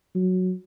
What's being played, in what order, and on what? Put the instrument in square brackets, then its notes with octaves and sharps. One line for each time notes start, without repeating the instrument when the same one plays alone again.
[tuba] F#3